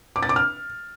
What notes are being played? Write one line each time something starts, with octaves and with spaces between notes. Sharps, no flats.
D6
A6
D6
F6